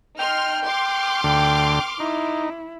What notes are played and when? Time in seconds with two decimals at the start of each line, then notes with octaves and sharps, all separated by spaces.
0.19 D#4 G5 C6 F6
0.64 C6 D6 F6
1.24 D2 D3 G5
2.00 D#4 E4